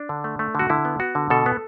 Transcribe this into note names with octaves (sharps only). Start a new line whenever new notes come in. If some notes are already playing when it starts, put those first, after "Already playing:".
Already playing: D4
D3
A3
A3
D3 F#4
D3 E4
B3
B3 F#4
D3
B2 A4
B3